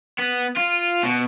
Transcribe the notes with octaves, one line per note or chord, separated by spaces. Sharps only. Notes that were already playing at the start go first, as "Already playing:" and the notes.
B3
F4
B2